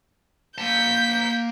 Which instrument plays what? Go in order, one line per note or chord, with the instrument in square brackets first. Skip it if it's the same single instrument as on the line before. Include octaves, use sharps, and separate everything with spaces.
[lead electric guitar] A#3 A5 [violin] G6 B6